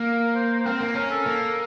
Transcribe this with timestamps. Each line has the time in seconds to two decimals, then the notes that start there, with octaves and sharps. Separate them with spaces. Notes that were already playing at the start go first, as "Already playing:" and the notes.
Already playing: A#3 A#4
0.35 C5
0.60 C5
0.65 C4 A#4
0.81 A#3
0.95 C#4 A#4
1.11 A4
1.26 A#3